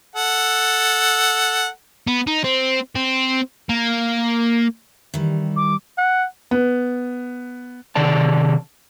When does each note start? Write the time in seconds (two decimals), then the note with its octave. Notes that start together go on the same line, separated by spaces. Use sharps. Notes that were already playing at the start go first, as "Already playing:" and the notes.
0.16 A4 F#5
2.07 B3
2.27 D#4
2.44 C4
2.96 C4
3.69 A#3
5.14 D#3 E3 G3
5.56 D6
5.98 F#5
6.51 B3
7.95 C3 D#3 G#4 D5 A5